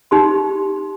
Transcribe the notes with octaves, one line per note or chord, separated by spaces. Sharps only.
D#4 G4 C6